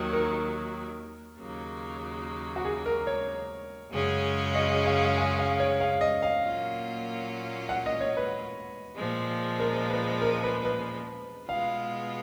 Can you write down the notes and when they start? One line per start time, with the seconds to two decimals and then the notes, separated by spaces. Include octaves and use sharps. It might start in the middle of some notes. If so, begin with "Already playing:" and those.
Already playing: D#2 D#3 F#3
0.13 A#4
1.39 D#2 C#3 F#3 A#3
2.56 F#4
2.65 G#4
2.86 A#4
3.07 C#5
3.91 F#2 C#3 G#3 C#4 G#4
4.55 D#5
4.86 F5
5.17 G#5
5.39 F5
5.60 C#5
5.80 F5
6.01 D#5
6.22 F5
6.44 A#2 F#3 A#3 C#4 F4
7.69 F#5
7.86 D#5
8.01 C#5
8.17 B4
8.96 A#2 F3 G#3
9.60 A#4
9.91 B4
10.22 A#4
10.44 B4
10.65 B4
11.49 B2 G#3 B3 F4 F5